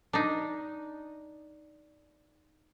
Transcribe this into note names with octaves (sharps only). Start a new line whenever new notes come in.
D4 D#4